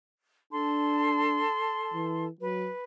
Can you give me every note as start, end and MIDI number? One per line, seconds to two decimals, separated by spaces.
0.53 1.44 62
0.53 2.26 69
0.53 2.26 81
0.53 2.26 84
1.94 2.29 52
2.41 2.69 54
2.41 2.84 71